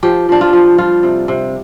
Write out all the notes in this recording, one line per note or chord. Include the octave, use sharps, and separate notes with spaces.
F3 G4
F3 D4
F4
F3
G3 F4
C3
C3